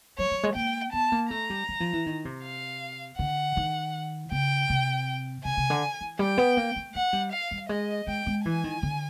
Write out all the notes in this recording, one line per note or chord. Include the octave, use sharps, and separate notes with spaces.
F#3 C#5
F#3
G#3
A#3 G5
B3 A5
A#3
A3 A#5
G3
F#3
F3
E3
D#3
C3
F5
D3 F#5
D#3
C#3 G5
C3
C3 G#5
C3
D3
E3
G3 G5
B3
A#3
A3
A3 F#5
G3
F5
G3
G#3 D#5
G#3 G5
G#3
E3 G#5
D#3
D3